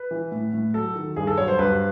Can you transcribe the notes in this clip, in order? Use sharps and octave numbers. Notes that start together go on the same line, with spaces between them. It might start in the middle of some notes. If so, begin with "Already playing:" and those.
Already playing: B4
E3
A2
A2
F#3 A4
D#3
G2 G#4
A4
F#3 C#5
C5
G2 B4